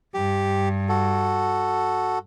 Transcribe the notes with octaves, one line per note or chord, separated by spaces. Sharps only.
G2 G4
F#4 A4